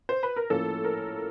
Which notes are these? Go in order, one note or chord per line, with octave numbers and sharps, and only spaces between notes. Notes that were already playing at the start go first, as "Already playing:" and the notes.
C5
B4
A#4
A2 F3 A#3 C#4 A4
A#4